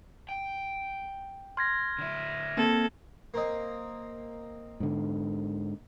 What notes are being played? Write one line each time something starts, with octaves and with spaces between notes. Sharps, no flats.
G5
C6 F6 G#6 A#6
D3 E4
A#3 C4 A4
A#3 C4 D#5
G#2 D3